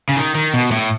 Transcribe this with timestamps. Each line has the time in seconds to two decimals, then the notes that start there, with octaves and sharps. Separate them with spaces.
0.09 C#3
0.17 D#3
0.35 D#3
0.54 B2
0.71 A2